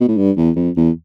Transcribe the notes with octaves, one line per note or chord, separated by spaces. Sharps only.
B2
A2
G2
E2
F2
E2